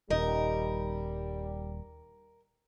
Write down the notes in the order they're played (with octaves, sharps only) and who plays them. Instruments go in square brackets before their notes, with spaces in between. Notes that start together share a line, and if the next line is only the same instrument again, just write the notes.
[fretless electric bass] D#1 [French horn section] G3 [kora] D#4 [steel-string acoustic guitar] A#4